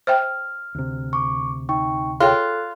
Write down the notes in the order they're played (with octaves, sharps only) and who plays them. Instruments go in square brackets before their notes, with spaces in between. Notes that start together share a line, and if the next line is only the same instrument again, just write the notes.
[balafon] C5 E5 G5 [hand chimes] F6
[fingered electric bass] D2 C3
[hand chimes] C#6 D6
D#4 G5 C#6
[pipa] F4 [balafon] G#4 C#5 G5 [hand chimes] A4 F#6